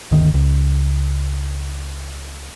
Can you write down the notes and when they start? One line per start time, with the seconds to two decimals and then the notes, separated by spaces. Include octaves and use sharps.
0.12 G1 D2 D#3
0.34 C#2